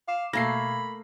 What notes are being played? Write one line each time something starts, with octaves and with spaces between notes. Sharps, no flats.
F5 D6 C7 E7
B2 A3 A#3 F5 B5 G#6 A#6 C7